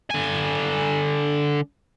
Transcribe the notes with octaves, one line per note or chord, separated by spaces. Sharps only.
D3 G#5